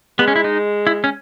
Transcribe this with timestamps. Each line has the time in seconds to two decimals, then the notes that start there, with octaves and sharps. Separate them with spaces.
0.19 G#3 B3
0.28 C#4
0.36 E4
0.44 D#4
0.87 E4
1.04 C#4